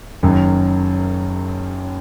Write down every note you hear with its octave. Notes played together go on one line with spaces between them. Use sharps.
F#1 F#2 D#3 F#3